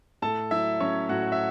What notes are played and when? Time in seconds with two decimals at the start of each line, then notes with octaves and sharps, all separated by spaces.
0.22 A2 A4 A5
0.51 F#3 E4 E5
0.80 F#3 C#4 C#5
1.09 A2 F#4 F#5
1.32 E5